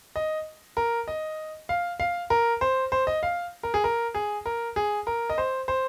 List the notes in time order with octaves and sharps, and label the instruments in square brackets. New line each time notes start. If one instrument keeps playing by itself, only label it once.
[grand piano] D#5
A#4
D#5
F5
F5
A#4
C5
C5
D#5
F5
A#4
G#4
A#4
G#4
A#4
G#4
A#4
D#5
C5
C5